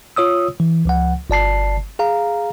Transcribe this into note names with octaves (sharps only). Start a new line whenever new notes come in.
F4 C#5 D#6 E6
E3
C#2 F3 F#5
G1 D5 A5 C7
G#4 F5 A#5